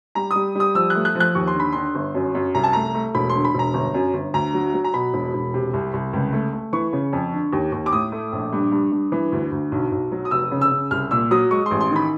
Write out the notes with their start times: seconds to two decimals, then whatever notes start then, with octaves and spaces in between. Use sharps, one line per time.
0.15 G3 A#5
0.31 G3 D#6
0.55 G3 D#6
0.75 F3 E6
0.90 A3 F#6
1.05 F#6
1.15 F3
1.20 F#6
1.35 D#2 C#6
1.47 C6
1.55 D3 B5
1.72 D3 C6
1.95 G1
2.15 F#2
2.35 F#2
2.55 C2 A#5
2.64 A5
2.73 A3 A#5
2.94 A3
3.15 E1 B5
3.30 C6
3.35 D3
3.44 B5
3.55 E1 A#5
3.74 G1
3.94 F#2
4.14 G1
4.34 D2 A#5
4.54 F#3
4.74 F#3
4.84 A#5
4.93 B2 B5
5.14 E1
5.34 E1
5.54 C3
5.74 C2
5.93 C2
6.13 C#2
6.33 A3
6.53 A3
6.73 E3 C#6
6.93 C#3
7.13 F2
7.33 D3
7.53 D#2
7.72 D#2
7.86 D6
7.92 A2 D#6
8.12 A3
8.32 A#1
8.53 G2
8.72 G2
8.92 G2
9.12 E3
9.32 D2
9.52 D2
9.72 B1
9.92 B1
10.12 F#3
10.25 D#6
10.31 F1 E6
10.51 C#3
10.61 E6
10.71 C#3
10.91 C2 F6
11.11 A#2 E6
11.31 F#3 D#6
11.51 G#3 C#6
11.66 A1 C6
11.81 C6
11.91 D#3
11.96 B5